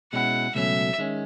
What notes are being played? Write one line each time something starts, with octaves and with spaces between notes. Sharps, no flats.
B2 G#3 C#4 E4 F#5
C#2 B2 F#3 A3 C#4 E5
D#3 G#3 C#4